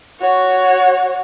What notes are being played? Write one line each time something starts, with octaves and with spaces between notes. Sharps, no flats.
F#4 C#5